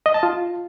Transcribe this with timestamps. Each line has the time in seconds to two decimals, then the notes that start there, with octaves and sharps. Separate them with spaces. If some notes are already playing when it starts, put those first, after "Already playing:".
0.06 D#5
0.14 A5
0.23 F4